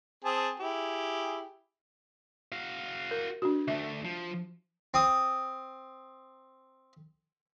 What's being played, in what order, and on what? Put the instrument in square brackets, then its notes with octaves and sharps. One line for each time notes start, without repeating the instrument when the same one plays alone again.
[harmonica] C4 G#4 A5
E4 G4 G#4
[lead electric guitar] F#4 F5
[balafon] A#4
D4 F#4
[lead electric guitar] D2 A3 [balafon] E5
[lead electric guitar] F3
[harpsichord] C4 D#6